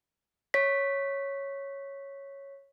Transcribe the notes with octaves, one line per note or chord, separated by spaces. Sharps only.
C#5 B6